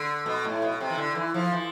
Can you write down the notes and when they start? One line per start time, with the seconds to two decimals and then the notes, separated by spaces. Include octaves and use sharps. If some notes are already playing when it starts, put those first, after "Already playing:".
Already playing: D3
0.26 B2
0.45 A2
0.62 B2
0.81 C3
0.90 E3
0.98 D3
1.15 E3
1.34 F3
1.52 E3